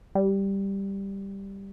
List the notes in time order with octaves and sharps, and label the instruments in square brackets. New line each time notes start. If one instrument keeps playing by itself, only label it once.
[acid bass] G3